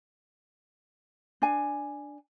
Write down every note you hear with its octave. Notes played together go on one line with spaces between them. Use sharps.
D4 G#5